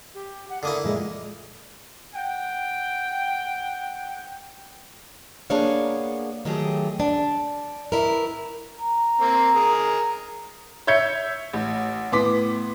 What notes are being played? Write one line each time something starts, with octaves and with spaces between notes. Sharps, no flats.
G4
F#5
D3 A#3 E4 D#6
A#2 G#3 D#5 E5
F#5 G5
A#3 B3 D4 G#4 C#5 F5
D#3 F#3 A3 G4 G#4
D4
E3 E4 A#4
A#5
A#3 C4
G#4 A#4
C#5 E5 G6 G#6 C#7
A1
A2 B3 C6 D6 B6